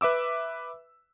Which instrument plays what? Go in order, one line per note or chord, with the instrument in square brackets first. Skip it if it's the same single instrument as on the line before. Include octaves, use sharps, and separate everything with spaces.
[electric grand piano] B4 E5 D6 E6